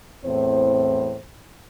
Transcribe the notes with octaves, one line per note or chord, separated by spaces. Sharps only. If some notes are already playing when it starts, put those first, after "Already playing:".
E2 A2 C4 C5